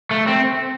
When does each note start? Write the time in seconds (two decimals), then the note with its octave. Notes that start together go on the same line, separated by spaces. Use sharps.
0.11 A3
0.27 C4